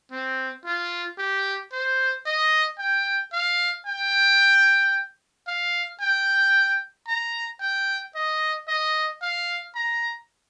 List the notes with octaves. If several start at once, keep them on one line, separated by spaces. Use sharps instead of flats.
C4
F4
G4
C5
D#5
G5
F5
G5
F5
G5
A#5
G5
D#5
D#5
F5
A#5